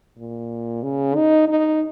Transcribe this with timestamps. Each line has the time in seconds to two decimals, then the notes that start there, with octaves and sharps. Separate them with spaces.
0.18 A#2
0.83 C#3
1.15 D#4
1.48 D#4